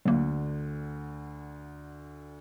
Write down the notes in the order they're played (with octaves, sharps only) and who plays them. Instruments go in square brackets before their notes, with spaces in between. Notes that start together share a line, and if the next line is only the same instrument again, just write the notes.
[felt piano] D2 D3 [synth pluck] F#3 A#3